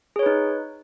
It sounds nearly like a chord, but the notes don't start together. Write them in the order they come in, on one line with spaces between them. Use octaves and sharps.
G#4 C#5 B4 D#4